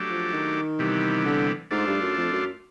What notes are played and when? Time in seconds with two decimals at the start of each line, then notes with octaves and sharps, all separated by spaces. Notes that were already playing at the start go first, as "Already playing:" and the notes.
Already playing: F#3 A3 D4 G4
0.10 F3
0.33 D#3
0.79 C3 E3 G3 B3
1.25 D3
1.71 G#2 A3 D4 F4
1.87 G2
2.02 F#2
2.17 F2
2.32 F#2